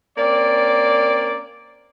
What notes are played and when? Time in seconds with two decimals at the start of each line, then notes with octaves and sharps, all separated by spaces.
0.17 A#3 C4 C#4 D5